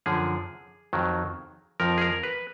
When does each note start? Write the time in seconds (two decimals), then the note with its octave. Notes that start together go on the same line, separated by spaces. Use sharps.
0.06 F#2 D3 F3 G#4
0.93 F2 D#3 F#3
1.80 F2 F3 A#4
1.98 G#4
2.01 A#4
2.23 B4